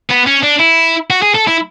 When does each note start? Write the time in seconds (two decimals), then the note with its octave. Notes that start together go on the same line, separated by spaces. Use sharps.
0.10 B3
0.26 C#4
0.43 D4
0.59 E4
1.10 F#4
1.22 G#4
1.35 A4
1.47 E4